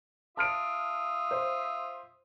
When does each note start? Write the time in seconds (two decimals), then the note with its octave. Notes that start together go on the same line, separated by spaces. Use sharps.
0.37 F4 E5 A5 D#6 F6 D7
1.31 C5